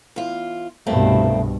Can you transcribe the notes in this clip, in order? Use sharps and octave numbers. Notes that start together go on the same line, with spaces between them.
E2 F4
C2 G2 B2 A3 A#3 C4